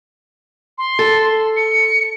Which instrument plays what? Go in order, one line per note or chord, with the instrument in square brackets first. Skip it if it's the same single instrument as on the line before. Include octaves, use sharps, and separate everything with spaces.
[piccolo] C6
[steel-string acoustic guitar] A4
[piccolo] C#7